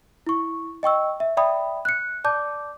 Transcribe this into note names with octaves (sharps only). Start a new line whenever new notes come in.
E4 C#6
D#5 G5 C#6 E6
E5
D5 E5 G5 B5 D#6
F#6 C#7
D5 A5 D6 G6